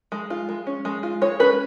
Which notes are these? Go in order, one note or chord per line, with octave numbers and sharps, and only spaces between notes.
G#3
F4
G#3
C#4
G#3
F4
G#3 C#5
C#4 B4